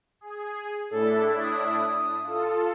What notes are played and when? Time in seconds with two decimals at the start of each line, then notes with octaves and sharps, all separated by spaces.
0.21 G#4
0.91 A2 D4 E4 A4
1.42 D#6
2.23 F4 A4